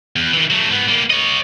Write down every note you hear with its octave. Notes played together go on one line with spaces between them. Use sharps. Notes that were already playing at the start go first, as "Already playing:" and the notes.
E2
D#3 E3
F#3 A3
G#2 B3
G3 A#3
C#5 D#5